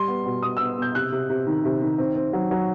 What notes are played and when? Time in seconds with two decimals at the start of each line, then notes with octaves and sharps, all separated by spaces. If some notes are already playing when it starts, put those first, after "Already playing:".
Already playing: G3 C6
0.08 B3
0.26 B2
0.43 B2 D#6
0.57 E6
0.61 B3
0.77 B2 G6
0.95 C3 F#6
1.12 C3
1.30 C3
1.47 D#3
1.65 C3
1.82 D#3
1.98 C4
2.16 C4
2.33 F#3
2.51 F#3